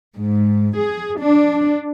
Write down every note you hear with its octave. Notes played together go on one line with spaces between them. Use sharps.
G#2
G#4
D4